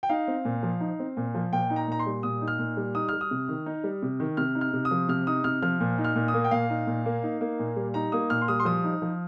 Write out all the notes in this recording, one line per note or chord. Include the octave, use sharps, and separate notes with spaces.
G5
D#4 F5
C4
A#2
F3
D#4
C4
A#2
F3
A#2 G5
D#4
A#5
A#2 A#5
C6
G3
A#2 D#6
D#4
F6
A#2
G3
D#4 D#6
G3 F6
D#6
C3
D#3
D#4
G3
C3
D#3
C3 F6
D#4
F6
C3
D#6
F3
C3 F6
D#4 D#6
C3 F6
F3 F6
A#2
D#4
F6
A#2
D#6
A#3
G5
A#2 F5
D#4
A#2
A#3
D#4
A#3
A#2
G3
D#4 A#5
A#3 D#6
A#2 F6
C6
G3 D#6
C6
F3 D#6
D#4
F3